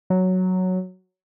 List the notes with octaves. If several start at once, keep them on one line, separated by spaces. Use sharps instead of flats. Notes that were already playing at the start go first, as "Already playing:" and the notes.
F#3